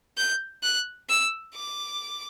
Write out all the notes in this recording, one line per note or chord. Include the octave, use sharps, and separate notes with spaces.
G6
F#6
E6
D6